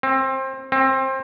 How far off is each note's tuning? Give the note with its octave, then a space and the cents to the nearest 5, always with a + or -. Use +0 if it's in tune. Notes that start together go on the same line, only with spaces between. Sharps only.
C4 +25
C4 +25